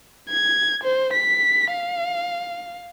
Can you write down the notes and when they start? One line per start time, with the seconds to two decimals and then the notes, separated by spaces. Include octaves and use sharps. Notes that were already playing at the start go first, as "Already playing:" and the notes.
0.29 G#6
0.83 C5
1.13 B6
1.72 F5